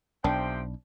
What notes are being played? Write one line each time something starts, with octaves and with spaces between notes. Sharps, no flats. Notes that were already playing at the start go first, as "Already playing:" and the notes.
B1 C3 F3 D4 G5